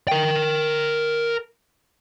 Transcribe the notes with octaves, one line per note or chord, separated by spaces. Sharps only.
A#4 G5